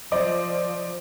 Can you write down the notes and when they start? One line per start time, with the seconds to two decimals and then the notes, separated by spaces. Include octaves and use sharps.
0.12 F3 C5 D5 D#5